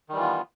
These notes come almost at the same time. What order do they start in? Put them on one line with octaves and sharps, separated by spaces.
D#3 G3 E3 F4 B3